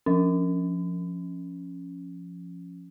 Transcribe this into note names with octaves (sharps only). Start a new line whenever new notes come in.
F3 C#4